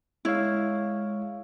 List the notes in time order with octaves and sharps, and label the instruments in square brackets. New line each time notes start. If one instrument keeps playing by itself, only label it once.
[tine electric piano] G#3 C#5 F5 [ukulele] E4